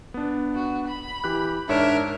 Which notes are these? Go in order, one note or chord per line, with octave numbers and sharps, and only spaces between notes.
B3 D4
F#4
B5
E3 G4 F#6
G#2 D4 A#4 C#5 E5 E7